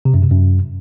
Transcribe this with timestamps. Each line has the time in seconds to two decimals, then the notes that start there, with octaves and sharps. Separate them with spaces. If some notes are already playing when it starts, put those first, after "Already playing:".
0.05 C3
0.14 F#2
0.22 C3
0.31 F#2